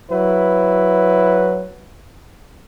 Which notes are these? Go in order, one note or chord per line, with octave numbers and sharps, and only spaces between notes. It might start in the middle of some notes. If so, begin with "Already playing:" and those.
F#3 E4 B4